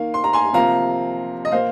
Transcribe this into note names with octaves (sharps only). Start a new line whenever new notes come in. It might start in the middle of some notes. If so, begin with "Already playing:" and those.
Already playing: D#3 A#3 F5
C6
A#5
G#5 C6
C3 F3 A#3 F5 A#5
D#5
A#2 A#3 C5 F5